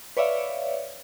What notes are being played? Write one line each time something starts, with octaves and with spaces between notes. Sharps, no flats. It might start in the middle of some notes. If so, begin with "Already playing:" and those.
B4 C#5 D5 E5 F5